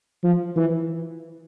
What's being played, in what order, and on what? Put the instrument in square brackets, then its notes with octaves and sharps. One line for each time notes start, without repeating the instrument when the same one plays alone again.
[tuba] F3
E3